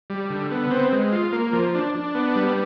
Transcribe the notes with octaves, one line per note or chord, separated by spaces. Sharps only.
G3
D3
B3
C4
G#3
F4
A#3
F3
D4
D4
B3
G3